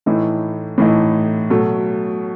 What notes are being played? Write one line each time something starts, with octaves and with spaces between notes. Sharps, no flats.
A2 E3 A3 D#4
A2 E3 A3 D#4
B2 F#3 A3